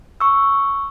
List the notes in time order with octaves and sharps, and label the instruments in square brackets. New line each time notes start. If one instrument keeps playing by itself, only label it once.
[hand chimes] C#6 E6